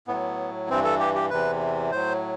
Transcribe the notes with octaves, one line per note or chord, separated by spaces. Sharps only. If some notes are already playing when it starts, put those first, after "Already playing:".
A2 F#3 B3
G2 E3 C4
A4
G4
G4
E2 C3 E3 B4
A2 F#3 C5